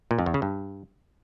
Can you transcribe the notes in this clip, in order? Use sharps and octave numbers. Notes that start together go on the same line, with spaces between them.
A#2
F2
E2
C#3
G2